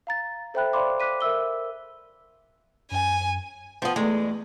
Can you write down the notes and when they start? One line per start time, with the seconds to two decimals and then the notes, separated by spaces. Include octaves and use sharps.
0.07 F5 A#5 A6
0.54 A4 C5 E5 G5 B5 F#6
0.73 C5 D5 F5 B5 C6 D6
1.00 D6 F#6 B6 D#7
1.21 A#4 E5 E6 G7
2.91 F#2 G#5
3.82 F3 B3 F4 G5
3.96 E2 G#3 A3 D5